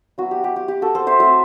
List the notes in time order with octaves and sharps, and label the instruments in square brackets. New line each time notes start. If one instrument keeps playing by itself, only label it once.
[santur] F#3 B3 E4 F#4
G4
G4
G4
G4
F#4 A4
A4 C5
C5 E5
F#3 A3 C4 E4 C5 E5